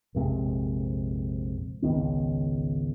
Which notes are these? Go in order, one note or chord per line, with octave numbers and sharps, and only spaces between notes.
A#1 F2 C3 G#3
G#1 C#2 D#3 B3